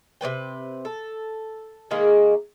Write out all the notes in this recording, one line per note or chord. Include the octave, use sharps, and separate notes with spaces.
C3 B3 B4 G5
A4
D#3 G#3 A#3 G#4